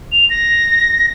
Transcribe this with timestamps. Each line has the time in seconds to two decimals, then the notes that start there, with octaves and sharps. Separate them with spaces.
0.12 F7
0.30 A#6